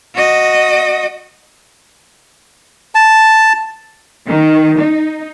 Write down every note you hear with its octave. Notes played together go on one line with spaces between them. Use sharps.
F#4 D#5
A5
D#3
D#4